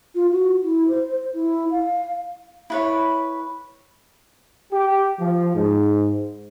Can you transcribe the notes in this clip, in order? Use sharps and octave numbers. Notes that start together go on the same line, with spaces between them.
F4
F#4
E4
C5
C5
E4
F5
E4 B4 C#5
G4
F3
G#2